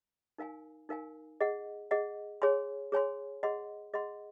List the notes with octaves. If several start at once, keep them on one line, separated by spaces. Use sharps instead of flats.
D#4 A#4 F5 G#5
D#4 A#4 F5 G#5
G#4 D#5 F#5
G#4 D#5 F#5
G#4 C#5 G#5 C6
G#4 C#5 G#5 C6
G#4 D#5 F#5 C6
G#4 D#5 F#5 C6